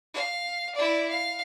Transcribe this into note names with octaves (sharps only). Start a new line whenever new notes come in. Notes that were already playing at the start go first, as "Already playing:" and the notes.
F5
E4 D5
F5